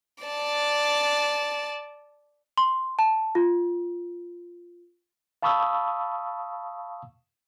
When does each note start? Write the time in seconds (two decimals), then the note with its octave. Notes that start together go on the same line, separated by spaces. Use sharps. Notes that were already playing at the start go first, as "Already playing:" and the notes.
0.24 D5 A5
2.58 C6
2.99 A5
3.35 F4
5.42 F5 A5 B5 C#6 D#6 E6